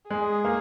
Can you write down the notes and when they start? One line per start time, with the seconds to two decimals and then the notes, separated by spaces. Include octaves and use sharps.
0.10 G#3 G#4
0.45 A#3